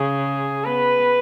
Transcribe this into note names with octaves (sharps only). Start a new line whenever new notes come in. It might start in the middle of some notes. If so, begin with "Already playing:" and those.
Already playing: C#3 G#4
B3 B4